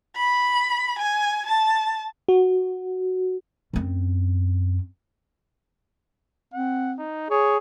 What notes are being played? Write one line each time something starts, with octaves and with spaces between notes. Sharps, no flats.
B5
G#5
A5
F#4
F#2 C4
C4 F#5
D#4
G#4 C#5